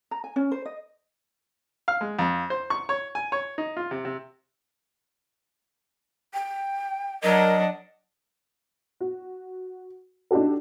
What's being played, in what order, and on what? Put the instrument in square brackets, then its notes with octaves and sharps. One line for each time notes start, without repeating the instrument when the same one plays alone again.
[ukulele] A#5
G#5
C#4
C5
D#5
[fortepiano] F5
G#3
F2
C5
C#6
C#5
G#5
C#5
D#4
F4
C3
C3
[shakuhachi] G5
[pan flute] F#3 [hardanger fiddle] D4 F#5 [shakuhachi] A#4 [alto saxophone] D#5
[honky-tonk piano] F#4
D4 D#4 F#4 G4 A4